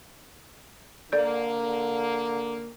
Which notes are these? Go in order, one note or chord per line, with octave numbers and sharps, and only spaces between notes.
D3 A#3 A4 D5 G6